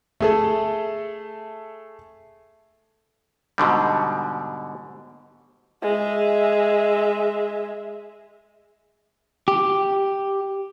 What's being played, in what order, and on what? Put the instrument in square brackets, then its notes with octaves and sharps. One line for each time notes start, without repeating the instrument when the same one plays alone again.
[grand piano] A3 G#4 A4
[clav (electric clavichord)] G#2 B2 D3 G3
[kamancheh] G#3 E5
[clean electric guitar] G4